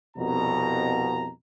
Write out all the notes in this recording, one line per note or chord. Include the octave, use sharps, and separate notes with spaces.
C2 F2 B2 A#5